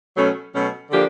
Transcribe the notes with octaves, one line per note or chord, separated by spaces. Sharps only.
B2 F#3 A3 C#4
B2 F#3 A3 C#4
D3 F3 A#3 D4 G4